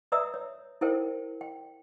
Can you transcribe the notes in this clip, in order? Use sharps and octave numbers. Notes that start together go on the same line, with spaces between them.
B4 D5 E5 A#5 D#6 E6
C#5
E4 A4 A#4 C5 G5
G5